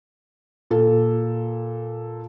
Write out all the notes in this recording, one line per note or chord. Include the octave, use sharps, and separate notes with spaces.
A#2 A4